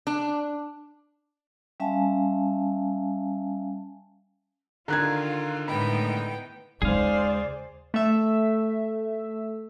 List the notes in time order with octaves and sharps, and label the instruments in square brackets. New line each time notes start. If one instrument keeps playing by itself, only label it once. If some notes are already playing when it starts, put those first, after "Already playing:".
[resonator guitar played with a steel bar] D4
[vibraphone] G3 C#4 E5 F5 G#5 A5
[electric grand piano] D3 D#3 [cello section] F4 [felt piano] A#5 F#6 G#6
[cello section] A2 G#3 D#4 [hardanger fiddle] B3 G5 [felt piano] B5
[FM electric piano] D#2 C#3 [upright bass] G#3 D#4 [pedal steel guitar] G#4 F5 [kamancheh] C5 D5
[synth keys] A3 E5